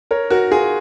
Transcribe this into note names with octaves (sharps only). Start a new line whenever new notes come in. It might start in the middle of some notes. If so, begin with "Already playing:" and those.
A#4 C#5
F#4 A#4
F4 G#4